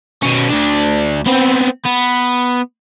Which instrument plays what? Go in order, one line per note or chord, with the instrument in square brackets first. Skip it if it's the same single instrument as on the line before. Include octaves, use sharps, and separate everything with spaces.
[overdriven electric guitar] B2 C#4
D2 D4
B3 C4
B3